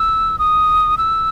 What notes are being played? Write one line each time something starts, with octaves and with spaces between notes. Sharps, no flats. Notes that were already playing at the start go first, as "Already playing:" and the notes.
Already playing: E6
D#6
E6